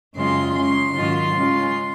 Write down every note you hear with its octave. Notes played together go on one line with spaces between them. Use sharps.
F#2 C#3 G#3 C4 F4 C6
C#3 G#3 C#4 C6
G#2 D#3 F#3 C#4 F4
C#3 G#3 C#4 F4